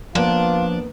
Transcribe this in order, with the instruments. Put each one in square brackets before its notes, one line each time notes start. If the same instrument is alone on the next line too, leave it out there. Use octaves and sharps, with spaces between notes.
[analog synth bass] F3 [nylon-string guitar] A#3 B3 [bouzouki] D4 [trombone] F4